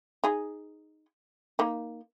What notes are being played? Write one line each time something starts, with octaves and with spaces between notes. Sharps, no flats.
D#4 G#4
A#3 D#4